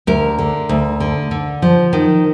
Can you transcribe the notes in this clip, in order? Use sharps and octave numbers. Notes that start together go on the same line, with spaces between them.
D2 A#4
D3
D2
D3
D3
F3
D#3